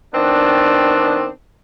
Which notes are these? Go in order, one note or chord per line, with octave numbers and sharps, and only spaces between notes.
D#3 B3 C4 D4